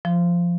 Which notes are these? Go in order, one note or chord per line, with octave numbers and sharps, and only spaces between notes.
F3